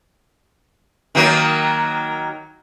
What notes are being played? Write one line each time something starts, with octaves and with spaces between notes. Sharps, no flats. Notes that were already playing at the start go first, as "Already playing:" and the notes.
D#3 F#3 A#3